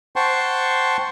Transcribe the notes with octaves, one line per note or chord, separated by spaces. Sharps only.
C5 F#5 G5 A5 C6 C#6